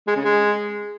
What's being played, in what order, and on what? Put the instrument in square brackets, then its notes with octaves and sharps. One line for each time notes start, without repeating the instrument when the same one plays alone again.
[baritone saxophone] G#3
C#3
G#3